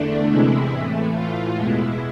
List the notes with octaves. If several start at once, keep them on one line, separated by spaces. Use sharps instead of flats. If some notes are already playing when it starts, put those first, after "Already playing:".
Already playing: E2 D3 A3 D4
E2 C3 E3 G#3 E4
A2 E3 A3
A2 E3 A3 F4
E2 B2 G#3 E4